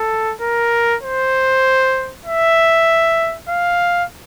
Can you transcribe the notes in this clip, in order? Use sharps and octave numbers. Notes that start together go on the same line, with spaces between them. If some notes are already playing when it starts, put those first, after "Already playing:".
Already playing: A4
A#4
C5
E5
F5